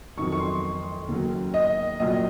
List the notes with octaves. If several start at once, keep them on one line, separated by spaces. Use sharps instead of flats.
F2 D#3 F#3 C#6
C#6
C6
D#2 C#3 F#3
D#5
A#1 A#2 F#3 D#5